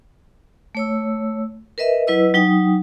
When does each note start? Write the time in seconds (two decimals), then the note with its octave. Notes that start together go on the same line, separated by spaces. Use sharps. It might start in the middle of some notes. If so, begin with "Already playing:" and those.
0.75 A3 C#5 E6
1.78 A#4 B4 D#5 E5
2.07 F#3 E4 B4 D#5 E6
2.34 F#3 D#4 G5 D#6